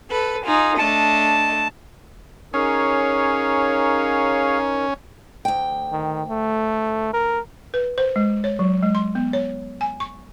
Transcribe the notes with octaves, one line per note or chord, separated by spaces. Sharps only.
A4 B4
D#4 F4 G#4
A3 D4 D#5 A5
C#4 D#4 G#4 A#4 C#5 F5
D2 G5
D#3
A3
A#4
B4
C5
G#3
C#5
F#3
G#3
C6
B3
C#5
G#5
C#6